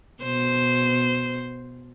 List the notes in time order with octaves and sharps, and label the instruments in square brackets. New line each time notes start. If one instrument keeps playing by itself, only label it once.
[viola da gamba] B2 C5